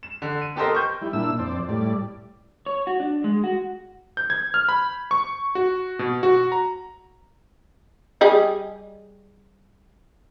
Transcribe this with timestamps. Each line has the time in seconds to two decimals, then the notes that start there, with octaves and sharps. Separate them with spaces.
0.03 E7
0.22 D3
0.42 D#7
0.56 B3 G4 A4 A#4 C5 D#5
0.75 C#6 G6
1.02 G3 E4
1.13 A#2 D4 E4 E6
1.39 F2 C5 D5
1.69 A2 G3 D5
2.66 C#5
2.87 F#4
3.00 D4
3.24 G#3
3.44 F#4
4.17 G6
4.30 G#6
4.54 F6
4.69 B5
5.11 C#6
5.55 F#4
5.99 B2
6.23 F#4
6.52 A#5
8.21 G3 G#4 D#5